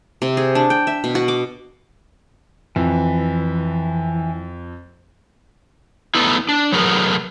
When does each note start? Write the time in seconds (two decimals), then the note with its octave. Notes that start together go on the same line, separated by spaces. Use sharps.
0.22 C3
0.37 G#4
0.55 D4
0.70 G5
0.87 E5
1.04 B2
1.15 F#4
1.28 D6
2.76 F2 E3
6.15 A3 B3 D#4 E4
6.49 D4
6.72 F#3 A3 B3 G#4 A#4